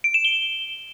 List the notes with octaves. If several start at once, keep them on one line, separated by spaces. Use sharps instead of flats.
D7
E7
G7